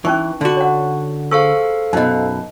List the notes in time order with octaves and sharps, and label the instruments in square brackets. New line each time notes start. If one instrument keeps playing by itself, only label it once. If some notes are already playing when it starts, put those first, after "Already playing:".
[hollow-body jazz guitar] E3 [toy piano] C#4 D#4 C#6
[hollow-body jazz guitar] D3 F#4
[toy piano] C#5 F#5
[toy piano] G#4 C#6 E6 [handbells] A4 C5 F5
[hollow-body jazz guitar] F#2 B2 [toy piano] D#4 D#5